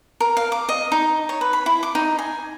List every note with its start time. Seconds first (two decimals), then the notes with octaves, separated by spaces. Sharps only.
0.20 A#4
0.37 F5
0.52 D6
0.69 D#5
0.92 D#4
1.29 C#5
1.41 B4
1.53 B5
1.66 E4
1.83 D6
1.95 D#4
2.19 G#5